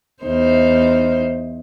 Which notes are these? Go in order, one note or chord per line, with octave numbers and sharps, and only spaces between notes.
E2 D#4 C5